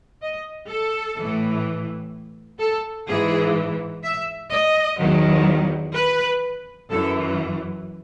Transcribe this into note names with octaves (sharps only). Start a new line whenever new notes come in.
D#5
A4
A2 E3
A4
G#2 E3 G#4
E5
D#5
E2 D#3 F#3
B4
F#2 E3 A4